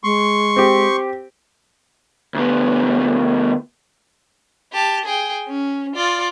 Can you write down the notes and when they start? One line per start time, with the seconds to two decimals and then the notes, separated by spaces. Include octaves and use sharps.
0.04 G#3 C6 C#6
0.56 C4 G4
2.34 D2 B3
4.73 G4 A5
5.05 G#4 G5
5.48 C#4
5.95 F4 D5